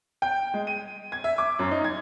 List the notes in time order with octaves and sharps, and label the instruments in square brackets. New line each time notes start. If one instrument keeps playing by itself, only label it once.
[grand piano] G5
G#3
D#7
G#6
E5
D6
F#2
D#4
G#6